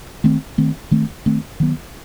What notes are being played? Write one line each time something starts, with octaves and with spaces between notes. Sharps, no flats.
D#3 A3 C4
D#3 A3 C4
D#3 A3 C4
D#3 A3 C4
D#3 F#3 B3